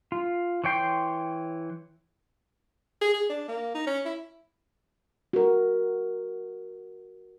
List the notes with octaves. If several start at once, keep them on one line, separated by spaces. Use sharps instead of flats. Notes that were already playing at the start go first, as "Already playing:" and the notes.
F4
E3 C#5 G5 C6
G#4
G#4
D4
A#3
D#4
C#4
E4
F#4 A#4